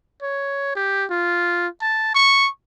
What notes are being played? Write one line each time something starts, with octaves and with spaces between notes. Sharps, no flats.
C#5
G4
F4
A5
C#6